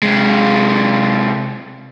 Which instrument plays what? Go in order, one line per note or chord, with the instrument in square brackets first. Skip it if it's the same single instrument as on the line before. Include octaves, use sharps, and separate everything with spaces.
[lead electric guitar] C3 G#3